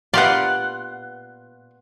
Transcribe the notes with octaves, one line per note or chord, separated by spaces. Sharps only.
A#2 B3 F4 G4 D5 F#5 C6